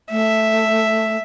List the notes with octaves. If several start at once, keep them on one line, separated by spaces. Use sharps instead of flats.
A3 E5